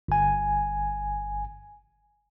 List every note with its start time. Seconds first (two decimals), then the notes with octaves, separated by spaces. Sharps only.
0.08 G1 G#5